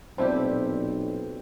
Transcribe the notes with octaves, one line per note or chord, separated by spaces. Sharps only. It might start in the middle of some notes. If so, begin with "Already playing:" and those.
B1 A#2 C4 E4 G4 C5 D5 A5